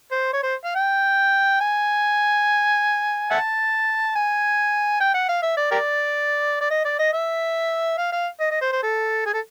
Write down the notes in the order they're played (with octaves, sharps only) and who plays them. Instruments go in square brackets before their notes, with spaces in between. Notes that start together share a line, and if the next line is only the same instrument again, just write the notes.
[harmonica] C5
C#5
C5
F5
G5
G#5
E5 F#5 A5
G#5
G5
F#5
F5
E5
D5
G4 A#4 D5
D5
D#5
D5
D#5
E5
F5
F5
D#5
D#5
C5
C5
A4
G#4
A4